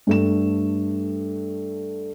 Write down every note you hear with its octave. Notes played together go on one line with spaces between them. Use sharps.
G2 A3 E7